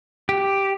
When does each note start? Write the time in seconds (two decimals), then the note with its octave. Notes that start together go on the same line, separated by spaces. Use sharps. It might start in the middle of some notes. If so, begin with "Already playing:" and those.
0.29 G4